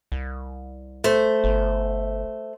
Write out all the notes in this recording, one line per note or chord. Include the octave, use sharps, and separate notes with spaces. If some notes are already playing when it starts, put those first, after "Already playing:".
C2
A3 C5
G1